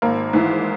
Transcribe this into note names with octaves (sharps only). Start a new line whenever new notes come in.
G#1 A#3
G#2 E3